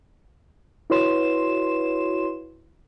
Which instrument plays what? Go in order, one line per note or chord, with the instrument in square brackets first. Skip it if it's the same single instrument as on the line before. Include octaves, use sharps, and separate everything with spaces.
[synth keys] E4 F#4 B4 C#5 C6 E7